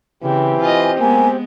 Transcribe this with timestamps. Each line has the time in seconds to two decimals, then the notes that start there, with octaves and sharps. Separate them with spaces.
0.23 C#3 E3 C4 G4
0.62 F4 D#5 G#5
1.00 G#3 A#3 B3 G#5